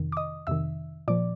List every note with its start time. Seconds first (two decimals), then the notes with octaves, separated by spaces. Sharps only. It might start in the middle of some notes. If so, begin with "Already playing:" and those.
Already playing: F2 C3 D#3
0.12 D6
0.17 D#5 D#6
0.47 F2 C3 D#3 E5 E6
1.08 A#2 F3 D5 D6